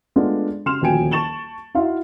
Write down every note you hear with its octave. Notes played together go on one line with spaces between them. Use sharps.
G#3 A3 B3 D4 F4
C#3 C6 F6 E7 F7
D#1 D2 F3 G5 G#5 D7
A5 C#6 A6 E7 F#7 G7
D#4 E4 F#4 E5 F5 C6